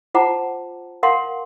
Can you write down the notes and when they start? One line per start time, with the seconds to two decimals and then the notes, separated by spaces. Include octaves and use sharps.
0.15 F4 C5 F#5 A5 A#5 D6
1.03 A#4 F5 F#5 C6